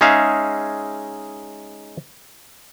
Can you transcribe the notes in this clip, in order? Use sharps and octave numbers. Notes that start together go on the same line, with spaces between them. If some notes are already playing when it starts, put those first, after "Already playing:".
G#3 C#4 D#4 G#4 E5 F5